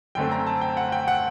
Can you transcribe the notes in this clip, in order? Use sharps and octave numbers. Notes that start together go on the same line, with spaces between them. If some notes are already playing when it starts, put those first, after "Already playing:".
F#2 D3 A3 C4 G5
A#5
A5
G5
F#5
G5
F#5